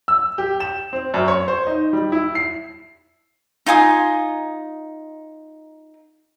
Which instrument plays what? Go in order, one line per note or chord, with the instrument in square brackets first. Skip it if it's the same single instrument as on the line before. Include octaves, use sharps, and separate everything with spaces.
[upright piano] E6
G4
E7
C4
F#2
C#5
C5
D#4
G3
E4
C7
[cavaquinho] D#4 F4 G#5 D#6